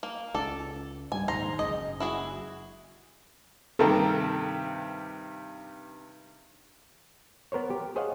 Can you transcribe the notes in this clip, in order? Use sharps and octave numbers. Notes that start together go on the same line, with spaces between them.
A#3
C#2 A4 D5
G#2 G3 D4 G#5
A#1 D#2 G#2 C5 A#5
F#1 G#3 D#5
E4 F#4 G#4
G2 C3 D#3 A4 A#4
B3 A#4 C5 C#5
G4
G#4 C5 C#5 D#5 F5 F#5